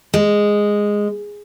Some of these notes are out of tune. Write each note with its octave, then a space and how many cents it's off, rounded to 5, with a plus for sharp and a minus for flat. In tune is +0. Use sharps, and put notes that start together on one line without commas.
G#3 -5